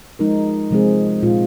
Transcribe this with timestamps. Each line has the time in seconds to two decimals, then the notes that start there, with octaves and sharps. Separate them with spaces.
0.19 F3 G#3 D#4 A#4
0.71 C3 F3 G#3 C4 G#4
1.23 A#2 G#3 F4